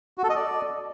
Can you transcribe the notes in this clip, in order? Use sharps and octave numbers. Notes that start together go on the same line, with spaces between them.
F#4
A4
D#5
D5